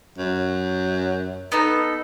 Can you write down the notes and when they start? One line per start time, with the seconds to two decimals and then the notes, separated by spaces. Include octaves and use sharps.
0.18 F#2
1.52 B3 D#4 A4